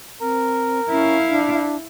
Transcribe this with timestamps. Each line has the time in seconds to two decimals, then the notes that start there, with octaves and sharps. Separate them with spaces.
0.21 C4 A#4
0.91 C#4 E4 F5
1.29 D4